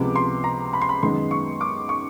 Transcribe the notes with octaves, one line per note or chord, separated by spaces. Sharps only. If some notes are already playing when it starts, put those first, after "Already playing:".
Already playing: C#2 C3 F3 G#3 B3 D6
C6
A#5
B5
C6
B5
F#2 D#3 G#3 B3 D#4 C6
C#6
D6
C#6